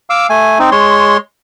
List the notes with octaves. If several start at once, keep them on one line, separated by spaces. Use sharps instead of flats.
F5 D6 E6
A3 G#5
C4 D#4
G#3 C#5 C6